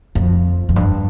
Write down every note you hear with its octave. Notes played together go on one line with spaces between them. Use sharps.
F2
F2
G2